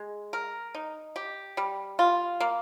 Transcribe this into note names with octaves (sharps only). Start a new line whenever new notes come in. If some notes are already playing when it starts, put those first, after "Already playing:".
Already playing: G#3
A#4
D#4
G4
G3
F4
A#3